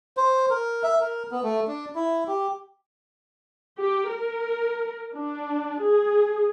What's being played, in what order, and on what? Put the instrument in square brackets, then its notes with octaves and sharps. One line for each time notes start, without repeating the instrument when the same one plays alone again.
[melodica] C5
A#4
E5
A#4
B3
A3
D4
E4
G4
[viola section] G4
A#4
D4
G#4